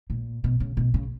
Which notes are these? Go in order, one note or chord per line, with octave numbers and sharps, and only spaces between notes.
A#2
B2
C#3
B2
C#3